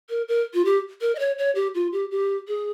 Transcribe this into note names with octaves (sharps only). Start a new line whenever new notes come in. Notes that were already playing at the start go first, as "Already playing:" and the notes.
A#4
A#4
F4
G4
A#4
D#5
C#5
C#5
G4
F4
G4
G4
G#4